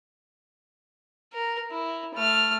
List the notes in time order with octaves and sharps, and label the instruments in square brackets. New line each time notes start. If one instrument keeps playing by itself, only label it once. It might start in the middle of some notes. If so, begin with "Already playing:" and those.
[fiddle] A#4
E4
A3 F6